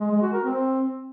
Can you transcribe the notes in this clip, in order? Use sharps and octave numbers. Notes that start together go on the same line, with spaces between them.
G#3
G#3
F#4
A#4
C4